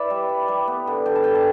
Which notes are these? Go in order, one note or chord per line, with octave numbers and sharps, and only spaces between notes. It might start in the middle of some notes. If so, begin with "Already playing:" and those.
Already playing: E4 B4 D5 E5
G3
E4
G3
B3
D3
D3 G5
A5
G3 G5
A5